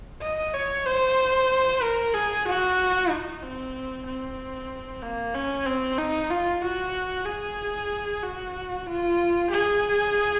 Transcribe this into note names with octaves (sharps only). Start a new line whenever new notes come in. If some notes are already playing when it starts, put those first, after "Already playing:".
D#5
C#5
C5
A#4
G#4
F#4
D#4
C4
C4
A#3
C#4
C4
D#4
F4
F#4
G#4
F#4
F4
G#4